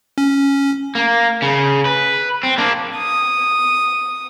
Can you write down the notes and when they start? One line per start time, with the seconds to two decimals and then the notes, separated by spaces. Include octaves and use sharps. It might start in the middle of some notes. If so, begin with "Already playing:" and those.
0.18 C#4
0.95 A#3
1.42 C#3
1.86 B4
2.43 C4
2.58 A#3 D4
2.98 D#6